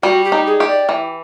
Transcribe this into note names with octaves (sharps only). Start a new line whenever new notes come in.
G3 F#4
G4
D#4
G#4
G4
D5
E3